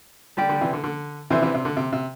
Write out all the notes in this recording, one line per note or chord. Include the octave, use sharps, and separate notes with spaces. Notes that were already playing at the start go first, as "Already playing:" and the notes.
D3 G3 G4 D5 G5
D3 G3
C3 E3
D3
D3
C3 E3 D4 A4 C5 E5
C3 E3
C3
D3
C3
C3